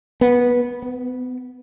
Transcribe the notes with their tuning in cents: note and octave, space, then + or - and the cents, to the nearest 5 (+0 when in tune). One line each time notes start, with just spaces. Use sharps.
B3 -15
B3 +35